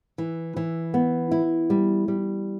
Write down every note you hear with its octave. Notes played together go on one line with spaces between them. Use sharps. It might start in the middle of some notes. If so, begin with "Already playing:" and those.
E3
E3
B3
E4
G3
G3